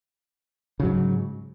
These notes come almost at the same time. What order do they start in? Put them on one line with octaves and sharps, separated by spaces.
C#3 F#3 G#2